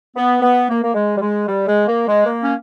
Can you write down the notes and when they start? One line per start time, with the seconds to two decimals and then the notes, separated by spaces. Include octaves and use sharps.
0.16 B3
0.42 B3
0.69 A#3
0.83 A#3
0.94 G#3
1.17 G3
1.21 G#3
1.48 G3
1.67 G#3
1.87 A#3
2.08 G#3
2.26 A#3
2.43 C#4